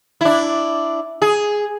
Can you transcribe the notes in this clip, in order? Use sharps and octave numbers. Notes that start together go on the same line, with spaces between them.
D4 E4
G#4